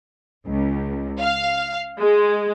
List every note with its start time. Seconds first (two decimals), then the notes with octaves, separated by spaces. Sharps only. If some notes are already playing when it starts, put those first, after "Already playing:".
0.47 C#2
1.21 F5
2.00 G#3